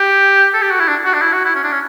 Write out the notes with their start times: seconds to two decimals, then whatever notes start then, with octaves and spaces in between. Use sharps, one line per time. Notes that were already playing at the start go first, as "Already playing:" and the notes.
Already playing: G4
0.54 A4
0.62 G4
0.71 F#4
0.79 E4
0.88 D4
1.05 F#4
1.13 D4
1.22 E4
1.33 F#4
1.45 E4
1.56 C#4
1.63 D4
1.72 C#4